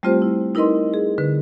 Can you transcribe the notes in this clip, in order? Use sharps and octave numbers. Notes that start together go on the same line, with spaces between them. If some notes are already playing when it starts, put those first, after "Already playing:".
G3 A3 C4 F4 G4 C5
E4
D#4 E4 A#4 B4 D#5 C6
G#4
D3 B4